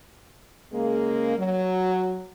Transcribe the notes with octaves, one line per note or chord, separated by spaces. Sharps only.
C#3 G#3 A#3
F#3